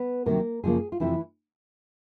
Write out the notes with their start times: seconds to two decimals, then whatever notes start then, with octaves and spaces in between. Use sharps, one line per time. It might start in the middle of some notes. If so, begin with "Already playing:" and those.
Already playing: B3 B4
0.26 D2 C3 D#3 F#3 A#3 A#4
0.63 F#2 C#3 F3 G#3 A#3 G#4
0.92 F4
1.00 F2 C3 E3 F3 A3 C4 E4